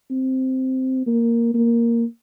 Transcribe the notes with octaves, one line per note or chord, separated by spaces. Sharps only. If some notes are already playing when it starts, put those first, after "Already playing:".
C4
A#3
A#3